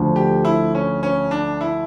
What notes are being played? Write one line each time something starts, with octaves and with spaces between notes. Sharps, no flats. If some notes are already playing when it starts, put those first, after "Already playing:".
Already playing: D2 D3 F3
G4
E4
C#4
C#4
D4
E4